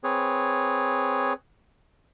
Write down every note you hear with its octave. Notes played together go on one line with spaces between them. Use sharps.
C4 G#4 B4 C#5